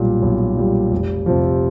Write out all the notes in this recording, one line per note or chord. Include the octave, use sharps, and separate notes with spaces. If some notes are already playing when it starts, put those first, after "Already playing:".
Already playing: B1 A#2 G3
B1
A#2 G3
F1
F2 C3 F3